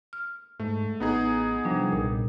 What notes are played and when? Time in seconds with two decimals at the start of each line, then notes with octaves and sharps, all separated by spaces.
0.13 F6
0.59 G#2 A3
1.00 A1 B3 D#4 G#4
1.65 C3 F3 G3 D4
1.92 B1 A#2